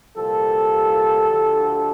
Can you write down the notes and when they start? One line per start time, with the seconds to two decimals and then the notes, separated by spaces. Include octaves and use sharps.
0.16 C2 A#2 F3 G4 A4
1.28 D2 D3 F3